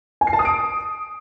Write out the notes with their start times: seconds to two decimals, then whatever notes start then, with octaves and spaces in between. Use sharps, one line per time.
0.21 G#5
0.27 C7
0.33 A5
0.39 D#6
0.45 D7